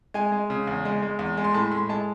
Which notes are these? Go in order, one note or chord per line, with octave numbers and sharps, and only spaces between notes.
G#3 G#5
G#3
C#3
E2
G#3
G#3
E2
G#3
C6
A2 A5
A2 C6
G#3 A5